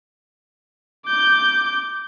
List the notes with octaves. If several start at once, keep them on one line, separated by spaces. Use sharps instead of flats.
D6 G6